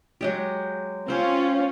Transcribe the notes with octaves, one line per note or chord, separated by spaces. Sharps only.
F#3 G#3 G4
C4 C#4 F4 C5